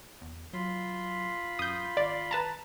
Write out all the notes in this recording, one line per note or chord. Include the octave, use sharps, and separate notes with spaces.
E2
F#3 F4 B5 C6
F#2 D#6 G6
G#1 D5
B4 A5 A#5